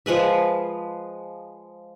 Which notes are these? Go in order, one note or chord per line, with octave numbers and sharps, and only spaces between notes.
F3 G#3 B4 E5